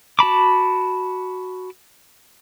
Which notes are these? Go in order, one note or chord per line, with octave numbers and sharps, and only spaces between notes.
F#4 A5 B5 D6